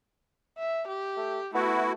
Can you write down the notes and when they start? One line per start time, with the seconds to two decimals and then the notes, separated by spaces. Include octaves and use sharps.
0.58 E5
0.87 G4
1.17 A3
1.54 A3 B3 E4 F#4